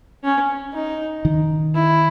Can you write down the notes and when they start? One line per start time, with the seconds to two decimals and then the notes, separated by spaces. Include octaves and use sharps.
0.24 C#4
0.74 D#4
1.25 D#3
1.75 E4